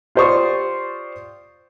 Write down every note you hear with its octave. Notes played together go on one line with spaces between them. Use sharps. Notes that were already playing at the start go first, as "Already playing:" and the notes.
F4 G4 C5 D5 C#6 D#6